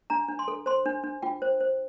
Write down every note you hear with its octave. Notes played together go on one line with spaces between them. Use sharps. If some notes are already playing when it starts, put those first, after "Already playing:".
D4 A#5
D4
C6
A4
C5 C6
D4
D4
F4 G5
C5
C5